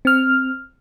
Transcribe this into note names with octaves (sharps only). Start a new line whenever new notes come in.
C4 F6